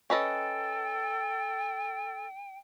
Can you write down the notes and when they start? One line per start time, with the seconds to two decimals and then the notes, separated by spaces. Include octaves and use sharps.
0.10 C#4 A4 B4 D#5 G5